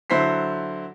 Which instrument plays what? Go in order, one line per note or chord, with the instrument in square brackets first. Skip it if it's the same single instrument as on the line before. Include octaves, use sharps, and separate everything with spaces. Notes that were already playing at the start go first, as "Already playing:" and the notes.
[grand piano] D3 F#3 E4 C5 B6 C7